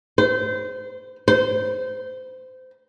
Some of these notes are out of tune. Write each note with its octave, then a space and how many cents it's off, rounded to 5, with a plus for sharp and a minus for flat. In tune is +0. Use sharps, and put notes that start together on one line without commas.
C5 -30
C5 -25